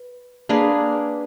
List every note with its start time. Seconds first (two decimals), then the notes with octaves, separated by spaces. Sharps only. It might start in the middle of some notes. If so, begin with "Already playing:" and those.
Already playing: B4
0.49 A#3 D4 G#4 B4